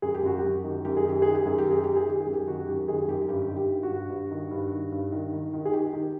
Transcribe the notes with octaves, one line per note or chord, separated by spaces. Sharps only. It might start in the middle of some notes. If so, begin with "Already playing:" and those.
F#2 G#4
G4
F#2 F#4
G4
F#2
D#3
F#2 G4
G#4
D#3 G4
D#3 G#4
G4
F#2 G#4
G4
D#3
G#4
D#3 G4
G#4
D#3 G4
G#4
F#2
G4
D#3 F#4
F#2 G4
D#3 G#4
G#4
F#2 G4
G2 G4
D#3
G4
G2
F#4
G2
G2
D#3
G2
D#3
G2
D#3
D#3
D#3
G#4
D#3 G4
D#3